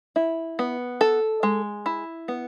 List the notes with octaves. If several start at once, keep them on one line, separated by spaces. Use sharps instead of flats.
E4
B3
A4
G#3
E4
B3